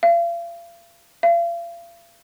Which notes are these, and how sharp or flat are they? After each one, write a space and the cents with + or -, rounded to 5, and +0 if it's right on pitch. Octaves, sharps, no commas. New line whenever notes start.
F5 -40
F5 -40